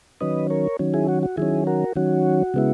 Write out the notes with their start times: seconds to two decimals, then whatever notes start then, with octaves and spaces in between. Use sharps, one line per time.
0.21 D#3 F#3 C#4 B4 D#5
0.50 A#4 C#5
0.79 D#3 F#3 C#4
0.94 E4 G#4
1.08 F#4
1.23 F#4
1.37 D#3 F#3 C#4 E4 G#4
1.67 F#4 A#4
1.96 D#3 F#3 C#4 F#4
2.54 C#3 G#3 B3 E4